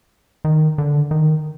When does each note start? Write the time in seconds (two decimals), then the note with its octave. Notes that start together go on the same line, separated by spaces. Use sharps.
0.45 D#3
0.78 D3
1.11 D#3